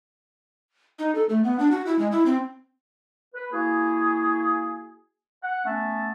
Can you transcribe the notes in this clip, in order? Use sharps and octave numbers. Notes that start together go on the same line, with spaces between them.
D#4
A4
A3
B3
D4
F#4
E4
G#3
E4
C4
B4
A#3 E4 F#4 G#4
F#5
A3 B3 C#4 E5 A5